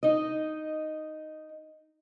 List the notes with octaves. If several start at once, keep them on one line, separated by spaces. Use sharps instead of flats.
D#4 D#5